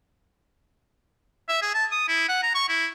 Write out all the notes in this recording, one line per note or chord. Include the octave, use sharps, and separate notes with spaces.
E5
G#4
A5
D#6
E4
F#5
A#5
C#6
E4